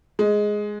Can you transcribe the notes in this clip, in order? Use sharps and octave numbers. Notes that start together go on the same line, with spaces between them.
G#3